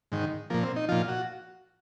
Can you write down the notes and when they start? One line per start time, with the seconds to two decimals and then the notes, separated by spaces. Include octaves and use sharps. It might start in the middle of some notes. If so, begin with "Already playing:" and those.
0.12 G#2 D#3
0.50 A#2 F3 A#3
0.63 C4
0.76 D#4
0.89 A#2 F3 F4
1.08 F#4